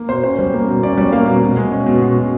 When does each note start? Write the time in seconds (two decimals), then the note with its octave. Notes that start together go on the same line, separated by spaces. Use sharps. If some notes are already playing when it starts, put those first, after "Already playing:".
Already playing: A#3
0.09 B2 C5
0.23 C#4 C5
0.39 G3
0.54 A#3
0.68 B2
0.83 C#4 D5
0.97 G3 D5
1.12 A#3 F5
1.27 B2
1.43 B2
1.57 G#3
1.72 C#4
1.86 B2
2.02 B2
2.16 G#3